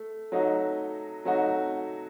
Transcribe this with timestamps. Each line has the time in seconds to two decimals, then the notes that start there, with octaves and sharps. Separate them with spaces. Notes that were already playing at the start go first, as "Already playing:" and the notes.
Already playing: A3
0.32 F#3 A3 D#4 F#4
1.25 F#3 A3 D#4 F#4